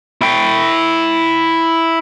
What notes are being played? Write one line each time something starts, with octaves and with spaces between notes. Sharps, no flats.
E4 G5